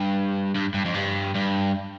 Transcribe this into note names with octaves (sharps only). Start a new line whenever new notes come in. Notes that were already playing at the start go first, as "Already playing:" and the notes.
Already playing: G2
G2
G2
F2
G2
G2